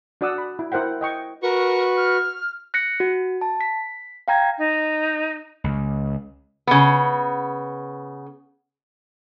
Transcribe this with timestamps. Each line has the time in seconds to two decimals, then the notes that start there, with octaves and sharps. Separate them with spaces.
0.21 D4 F#4 D5 F#5 D#6 E6
0.38 B5
0.59 E4
0.72 E4 A#4 C5 F#5 G5
1.01 D#5 G5 C#6
1.43 F#4 A#4 B4 C#6
1.97 F6
2.74 F#6 A#6 C#7
3.00 F#4
3.41 A5
3.61 B6
4.28 F5 G5 A#5 G#6 A#6
4.59 D#4
5.64 C#2
6.67 C#3 B3